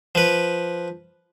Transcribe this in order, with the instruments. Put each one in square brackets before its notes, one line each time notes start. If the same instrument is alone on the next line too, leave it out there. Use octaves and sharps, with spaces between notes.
[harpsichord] F3 B4